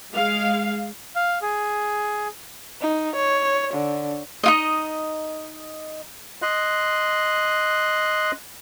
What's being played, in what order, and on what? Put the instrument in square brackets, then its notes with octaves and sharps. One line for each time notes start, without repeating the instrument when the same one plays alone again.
[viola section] G#3 F5
[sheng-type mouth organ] F5
G#4
[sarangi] D#4
C#5
D3
[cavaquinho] D#4 F4 D#5
[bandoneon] D#5 C6 F#6